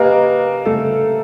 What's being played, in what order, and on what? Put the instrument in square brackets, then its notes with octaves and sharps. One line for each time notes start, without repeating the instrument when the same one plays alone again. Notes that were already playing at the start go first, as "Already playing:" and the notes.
Already playing: [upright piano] A#3 A#4 [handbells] G4 B4 D#5 G#5
[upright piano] A3 A4